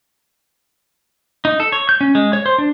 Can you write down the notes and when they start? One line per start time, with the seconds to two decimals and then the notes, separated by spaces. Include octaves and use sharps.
1.45 D#4
1.60 A4
1.72 C#5
1.89 G6
2.01 C#4
2.15 G#3
2.33 C#5
2.46 C5
2.58 D4